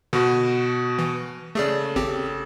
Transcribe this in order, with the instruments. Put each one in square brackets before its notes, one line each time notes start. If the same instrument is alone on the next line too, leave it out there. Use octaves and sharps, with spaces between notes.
[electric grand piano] B2 F#4 [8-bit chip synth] D3
[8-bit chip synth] E3
[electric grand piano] C#3 A4 [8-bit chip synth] A3 G#4 D5
[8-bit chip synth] G#1 C4 G4